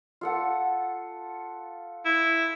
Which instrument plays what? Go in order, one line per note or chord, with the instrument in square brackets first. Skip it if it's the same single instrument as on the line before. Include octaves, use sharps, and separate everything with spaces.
[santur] F4 A4 F#5
[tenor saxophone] E4